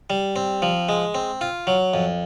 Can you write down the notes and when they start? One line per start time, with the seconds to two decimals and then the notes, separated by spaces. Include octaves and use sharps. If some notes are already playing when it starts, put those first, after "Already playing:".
0.10 G3
0.36 C4
0.62 F3
0.89 G#3
1.14 C4
1.41 F4
1.67 F#3
1.94 F2